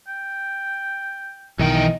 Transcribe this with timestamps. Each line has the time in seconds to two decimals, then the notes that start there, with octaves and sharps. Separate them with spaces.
0.07 G5
1.59 B1 D#3 E3 D#4 D#5 G5